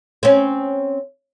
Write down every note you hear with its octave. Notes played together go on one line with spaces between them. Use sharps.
C4 C#4